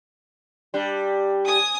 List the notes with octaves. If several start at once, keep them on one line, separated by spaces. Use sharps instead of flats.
G3 D4
G#5 D#6